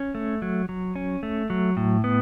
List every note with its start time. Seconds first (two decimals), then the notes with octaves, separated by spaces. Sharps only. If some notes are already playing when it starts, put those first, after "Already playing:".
Already playing: C#4
0.15 A3
0.42 F#3
0.69 F#3
0.96 C#4
1.23 A3
1.50 F#3
1.77 A2
2.04 B3